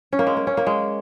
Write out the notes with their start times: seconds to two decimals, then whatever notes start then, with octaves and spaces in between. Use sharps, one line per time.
0.13 C#4
0.19 A#3
0.27 G#3
0.37 A#3
0.47 C#4
0.57 A#3
0.67 G#3